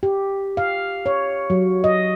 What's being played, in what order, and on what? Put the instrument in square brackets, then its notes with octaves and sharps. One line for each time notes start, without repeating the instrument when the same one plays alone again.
[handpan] G4
F5
C#5
F#3
D#5